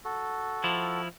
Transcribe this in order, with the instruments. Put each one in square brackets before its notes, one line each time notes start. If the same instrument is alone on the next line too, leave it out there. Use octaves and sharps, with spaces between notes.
[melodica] F#4 A4
[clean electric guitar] F3 E4